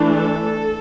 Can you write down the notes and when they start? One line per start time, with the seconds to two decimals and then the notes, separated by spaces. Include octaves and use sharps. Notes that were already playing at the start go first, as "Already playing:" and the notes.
Already playing: E3 A3 D4
0.16 A4